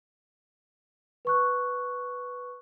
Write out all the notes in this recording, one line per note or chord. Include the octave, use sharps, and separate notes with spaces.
B4 C#6 F#6